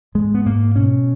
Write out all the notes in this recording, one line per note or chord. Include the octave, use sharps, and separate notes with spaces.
G#2 G#3
B3
G#2 A#3
B2 C#4